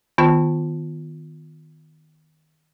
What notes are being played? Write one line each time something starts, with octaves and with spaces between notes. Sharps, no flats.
D#3 B3 F4 A5